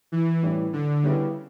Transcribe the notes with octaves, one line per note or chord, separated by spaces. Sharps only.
E3
A2 E3 G3 C#4
D3
C#3 G3 B3 E4 G4 B4